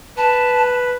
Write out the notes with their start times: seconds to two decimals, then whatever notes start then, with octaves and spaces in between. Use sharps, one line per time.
0.17 B4 A5